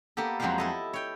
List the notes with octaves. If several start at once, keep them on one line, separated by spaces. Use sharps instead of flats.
A#3 B3 G4 A4
F2 F#3 G#3 E4 G4 F5
E4 A4 D#5
C#5 G5